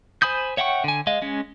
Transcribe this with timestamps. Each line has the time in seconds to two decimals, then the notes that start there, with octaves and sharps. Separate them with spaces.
0.22 C5 G#5 B5 D#6 G6
0.57 C#5 E5 F#5 G5 C#6
0.84 D3 G#5
1.07 G#3 D#5 F5
1.22 G#3 C#4